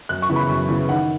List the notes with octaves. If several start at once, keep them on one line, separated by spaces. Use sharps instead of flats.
F#2 F#6
C#6
C#3 E3 B3 E4
B5
F#2
C#3 E3 B3 E4
D#3 F#5